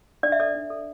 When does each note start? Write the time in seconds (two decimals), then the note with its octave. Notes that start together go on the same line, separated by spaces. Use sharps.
0.23 D4 D5
0.32 E5
0.39 A4 D5
0.55 D4
0.70 A4